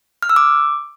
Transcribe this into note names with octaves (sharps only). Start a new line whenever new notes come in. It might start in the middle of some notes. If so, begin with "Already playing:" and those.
F6
E6
D6